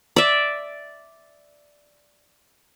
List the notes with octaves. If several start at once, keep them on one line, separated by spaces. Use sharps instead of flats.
D5 E5